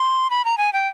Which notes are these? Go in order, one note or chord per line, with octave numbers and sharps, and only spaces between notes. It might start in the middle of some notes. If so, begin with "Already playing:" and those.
Already playing: C6
B5
A#5
G#5
G5